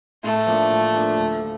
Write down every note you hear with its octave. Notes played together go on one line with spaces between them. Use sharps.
A2 A3
F3 A#3 D4
A2
F3 A#3 D4
D2
F3